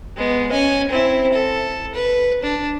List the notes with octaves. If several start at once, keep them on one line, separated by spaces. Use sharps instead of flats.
G#3 B3
C#4 G#5
C4 E4
A4
B4
D4